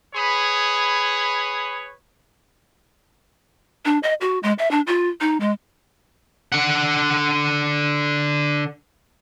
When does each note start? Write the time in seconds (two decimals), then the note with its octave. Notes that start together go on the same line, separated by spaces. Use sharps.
0.14 G#4 B4 C#5 B5 D#6
3.85 D4
4.03 D#5
4.21 F#4
4.43 G#3
4.59 E5
4.71 D4
4.87 F4
5.21 D#4
5.40 G#3
6.52 D3 F#5